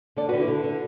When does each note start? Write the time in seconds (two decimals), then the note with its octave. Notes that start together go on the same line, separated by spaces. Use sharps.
0.16 D3 A4 D5
0.29 D3 F#4 B4
0.40 E4 A4
0.48 D3
0.64 D3